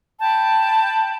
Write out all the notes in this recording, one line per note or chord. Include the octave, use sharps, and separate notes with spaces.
G5 A5 B5 G6